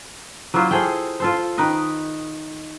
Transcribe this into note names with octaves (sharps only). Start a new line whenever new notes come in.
F#3 A#3 E4 F4
G#4 A4 C5 G5
F4 A4 C5
D#3 D#4 B4 D#5